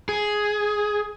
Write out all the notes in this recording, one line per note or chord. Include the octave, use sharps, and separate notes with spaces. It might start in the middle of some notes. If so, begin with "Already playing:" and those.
G#4